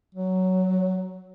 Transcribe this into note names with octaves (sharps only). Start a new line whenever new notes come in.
F#3